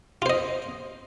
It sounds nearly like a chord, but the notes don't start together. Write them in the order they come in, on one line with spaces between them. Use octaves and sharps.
F4 C5 D#5